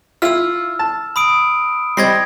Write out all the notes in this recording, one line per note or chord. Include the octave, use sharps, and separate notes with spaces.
E4 F4 E6 F6
A5
B5 D#6 D7
G3 C4 D#5 G#6 A#6 C7